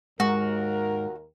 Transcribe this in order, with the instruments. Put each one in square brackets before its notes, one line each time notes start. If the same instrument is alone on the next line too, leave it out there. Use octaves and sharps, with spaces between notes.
[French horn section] D#2 A#4 [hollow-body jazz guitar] G#2 [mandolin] F#4